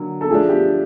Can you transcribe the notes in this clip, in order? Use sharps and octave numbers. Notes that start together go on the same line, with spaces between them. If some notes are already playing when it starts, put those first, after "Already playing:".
Already playing: D3 F#3 A#3
A4
F3 A3 D4 G#4
G4